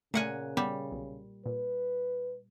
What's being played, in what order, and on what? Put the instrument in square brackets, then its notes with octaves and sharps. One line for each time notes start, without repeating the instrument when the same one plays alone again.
[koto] A#2 F#5 G#5 [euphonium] C#3 [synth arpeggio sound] A3 F6
[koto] G3 [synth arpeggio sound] B3
[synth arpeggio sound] B1
[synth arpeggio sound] A#2 [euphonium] B4